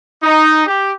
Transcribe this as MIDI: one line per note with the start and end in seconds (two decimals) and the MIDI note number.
0.22 0.65 63
0.66 0.91 67